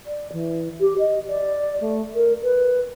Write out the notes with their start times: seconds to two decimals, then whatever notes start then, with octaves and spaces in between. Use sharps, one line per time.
0.06 D5
0.32 E3
0.80 G4
0.98 D#5
1.29 D5
1.80 A3
2.15 A#4
2.43 B4